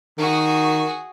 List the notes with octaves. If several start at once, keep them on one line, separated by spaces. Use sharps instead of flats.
D#3 F#4 G#4